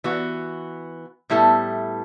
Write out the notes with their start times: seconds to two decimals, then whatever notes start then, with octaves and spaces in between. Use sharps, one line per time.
0.04 E3 B3 F#4
1.30 A2 G3 B3 E4 A4